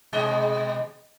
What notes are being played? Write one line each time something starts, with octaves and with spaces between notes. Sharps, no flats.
B2 G#3 D#5